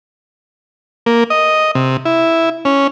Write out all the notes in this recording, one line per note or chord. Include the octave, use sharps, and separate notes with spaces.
A#3
D#5
C3
E4
C#4